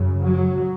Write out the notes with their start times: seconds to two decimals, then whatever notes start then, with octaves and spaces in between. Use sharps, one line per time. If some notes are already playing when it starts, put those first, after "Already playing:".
Already playing: F#2 C#3
0.22 F#3